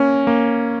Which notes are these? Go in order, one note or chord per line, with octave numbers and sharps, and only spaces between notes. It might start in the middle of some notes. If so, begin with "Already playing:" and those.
Already playing: A#3 C#4
A#3